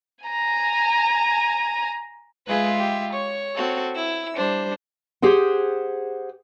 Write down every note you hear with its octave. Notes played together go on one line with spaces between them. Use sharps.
G#5 A#5
G#3 F4 G#4 B4 E5
G4
C#5 C#6
C4 F#4 A4
E4 E6
G3 D4 C5
G4 G#4 C5 F#5